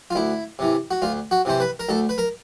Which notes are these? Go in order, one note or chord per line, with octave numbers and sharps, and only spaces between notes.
F4
D2 E4
C3 E3
F#4
D2 F4
F#4
C3 E3 C5
B4
A#4
D2 A4
B4
A#4